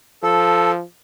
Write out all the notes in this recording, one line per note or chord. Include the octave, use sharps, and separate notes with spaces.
F3 A4